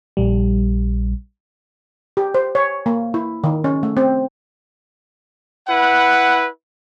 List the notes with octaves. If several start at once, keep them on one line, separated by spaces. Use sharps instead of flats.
A#1 G3
G4
C5
C#5
A#3
E4
D#3
C#4
A3
C4
E4 B4 F#5